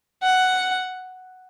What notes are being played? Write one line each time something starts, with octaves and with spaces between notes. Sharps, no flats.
F#5